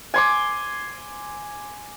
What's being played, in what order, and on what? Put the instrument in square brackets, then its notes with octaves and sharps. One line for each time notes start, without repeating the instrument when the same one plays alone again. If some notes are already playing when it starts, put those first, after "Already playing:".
[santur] G#5 C6 D6